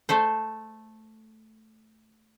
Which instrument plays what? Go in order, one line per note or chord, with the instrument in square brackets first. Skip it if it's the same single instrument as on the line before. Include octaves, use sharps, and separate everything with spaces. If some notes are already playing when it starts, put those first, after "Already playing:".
[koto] A3 A4 C5